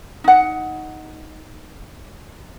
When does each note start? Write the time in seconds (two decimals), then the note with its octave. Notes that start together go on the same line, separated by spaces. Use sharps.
0.24 D#4 F#5